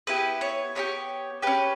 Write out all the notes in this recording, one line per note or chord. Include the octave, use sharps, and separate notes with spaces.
B3 E4 G4 B4
C#5
B3 E4 G4 C#5
C#4 G4 B4